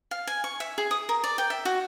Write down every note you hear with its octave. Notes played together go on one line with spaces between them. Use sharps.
F5
G#5
C#6
E5
G#4
D#6
A#4
D5
G5
E5
F#4